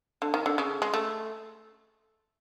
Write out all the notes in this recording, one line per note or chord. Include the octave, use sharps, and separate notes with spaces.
D3
D#3
D3
C#3
G#3
A3